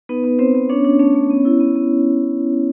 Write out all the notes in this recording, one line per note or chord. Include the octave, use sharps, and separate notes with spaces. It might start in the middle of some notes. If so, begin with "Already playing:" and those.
B3 D#4 B4
B3
B3 C4 C5
B3
C#4 D4 C#5
D4
A3 C#4 C#5
A3
B3
E4
B3
B3